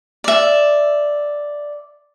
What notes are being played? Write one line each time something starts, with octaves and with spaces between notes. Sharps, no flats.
D5 E5